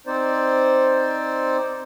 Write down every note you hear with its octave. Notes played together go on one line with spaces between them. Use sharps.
C4 D#4 C5 D5